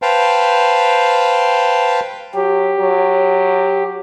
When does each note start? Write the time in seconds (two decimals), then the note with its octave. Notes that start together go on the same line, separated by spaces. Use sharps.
0.02 B4 C5 F5 G5 A5
2.35 F#3 G4
2.80 F#3